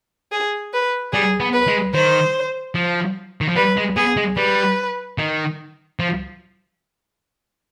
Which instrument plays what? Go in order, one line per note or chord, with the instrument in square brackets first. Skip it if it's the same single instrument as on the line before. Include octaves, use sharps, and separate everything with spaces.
[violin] G#4
B4
[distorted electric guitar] G3 [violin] G#4
[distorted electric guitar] B3
[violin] B4
[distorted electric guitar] G#3
[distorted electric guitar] D#3 [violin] C5
[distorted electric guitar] F3
D#3
F3
[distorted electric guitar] G3 [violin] B4
[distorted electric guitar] G#3
[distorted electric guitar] B3 [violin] G#4
[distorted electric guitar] G#3
[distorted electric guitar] G3 [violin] B4
[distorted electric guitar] D#3
F3